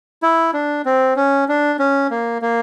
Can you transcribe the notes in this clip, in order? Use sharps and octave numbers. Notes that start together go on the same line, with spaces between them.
E4
D4
C4
C#4
D4
C#4
A#3
A#3